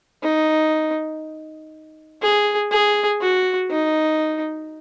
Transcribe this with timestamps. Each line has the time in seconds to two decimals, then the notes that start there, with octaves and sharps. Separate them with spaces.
0.23 D#4
2.22 G#4
2.71 G#4
3.22 F#4
3.71 D#4